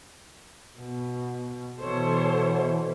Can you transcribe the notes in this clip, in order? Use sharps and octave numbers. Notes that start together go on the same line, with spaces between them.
B2
B2 E3 A4 C5 C#5